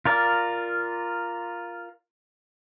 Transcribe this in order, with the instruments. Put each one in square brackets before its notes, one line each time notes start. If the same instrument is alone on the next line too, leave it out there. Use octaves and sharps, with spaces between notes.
[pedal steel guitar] F4 A#4 D5